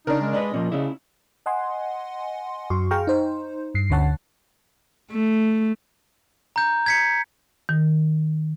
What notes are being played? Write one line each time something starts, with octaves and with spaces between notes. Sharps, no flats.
C#3 D4 D#4 A#4
G#3
D4 B4 D5 D#5
A#2 F3 A#3 C#4
C#3 C#4 E4
D#5 F#5 G#5 C6
F#2 F#4 C6 C#6
G#4 F5 G5 A#5 C#6 F6
D#4 C5
G2 C7
D2 D3 C#4 C#5 F#5 A5
A3
A#5 G6
G#6 B6 C#7
D#3